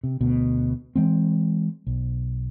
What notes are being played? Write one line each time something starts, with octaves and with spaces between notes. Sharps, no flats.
C3
D2 B2
E3 G#3 C4
B1